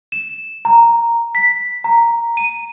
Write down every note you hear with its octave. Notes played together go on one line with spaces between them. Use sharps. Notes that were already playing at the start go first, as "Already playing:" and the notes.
E7
A#5
B6
A#5
D#7